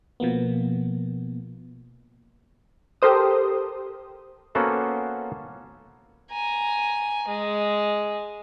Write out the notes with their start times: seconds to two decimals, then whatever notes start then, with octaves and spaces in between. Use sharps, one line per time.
0.20 B2 F3 A#3 B3
3.02 G4 A4 A#4 C5 D#6
4.55 A#3 B3 C#4 F#4 A4 C5
6.31 G#5 A#5
7.28 G#3